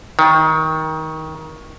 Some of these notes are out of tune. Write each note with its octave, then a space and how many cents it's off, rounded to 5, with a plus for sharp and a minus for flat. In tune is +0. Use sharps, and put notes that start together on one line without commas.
D#3 +20